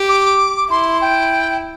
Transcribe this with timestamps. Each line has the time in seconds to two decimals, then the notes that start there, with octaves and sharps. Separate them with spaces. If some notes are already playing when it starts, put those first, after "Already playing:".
Already playing: G4
0.09 D6
0.70 E4 C6
1.01 G5